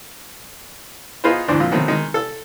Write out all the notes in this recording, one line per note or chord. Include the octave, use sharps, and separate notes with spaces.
B3 D#4 F4 G#4 B4 C5
D2 G#2 E3 D4 C5
F2 A#2
B2 D#3 F#3 A3 C4
D#3 G#3
A4 E6